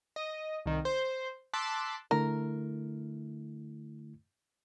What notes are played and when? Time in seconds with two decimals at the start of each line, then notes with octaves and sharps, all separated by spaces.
0.16 D#5
0.66 C2 D#3
0.85 C5
1.54 A5 C6 D6 E6 F#6 B6
2.11 D3 A3 E4 A#4